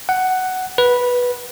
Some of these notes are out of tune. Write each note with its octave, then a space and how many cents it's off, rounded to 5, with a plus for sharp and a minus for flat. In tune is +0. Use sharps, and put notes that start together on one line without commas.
F#5 +10
B4 -10